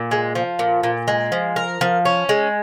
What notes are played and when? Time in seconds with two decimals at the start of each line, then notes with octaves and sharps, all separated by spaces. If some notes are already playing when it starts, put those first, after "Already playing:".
Already playing: A#2
0.11 G#3
0.35 F3
0.59 A#2
0.83 A#2
1.08 G#3
1.32 F3
1.56 A#4
1.81 F3
2.05 C#4
2.29 G#3